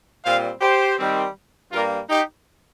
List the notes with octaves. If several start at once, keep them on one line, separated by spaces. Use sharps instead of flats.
A#2 G3 C4 C5 F5
G4 C5
D#3 G3 C4
G2 G3 A#3 F4 A#4
D#4 G4